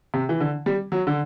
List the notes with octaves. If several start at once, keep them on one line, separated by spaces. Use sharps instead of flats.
C3
E3
D3
G3
F#3
D3